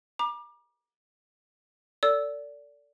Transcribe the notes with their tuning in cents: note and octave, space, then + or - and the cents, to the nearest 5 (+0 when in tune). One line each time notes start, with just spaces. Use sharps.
A#5 +45 D6 +25
A4 +40 D5 -20 E6 +0